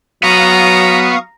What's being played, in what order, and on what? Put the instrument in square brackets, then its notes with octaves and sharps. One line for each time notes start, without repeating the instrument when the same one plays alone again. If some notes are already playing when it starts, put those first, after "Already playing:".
[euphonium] F#3 [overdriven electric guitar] B3 [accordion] F5 C#6 D#6 [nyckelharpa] A#5